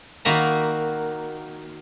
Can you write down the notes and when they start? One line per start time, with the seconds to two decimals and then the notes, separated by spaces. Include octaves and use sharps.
0.25 D#3 A#3 F#4 E5 A#5 B5